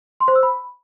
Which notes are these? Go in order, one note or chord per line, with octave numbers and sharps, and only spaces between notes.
C6
C5
E6
B5